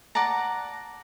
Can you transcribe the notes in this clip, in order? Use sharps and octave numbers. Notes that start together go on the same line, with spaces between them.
D5 F#5 A5 A#5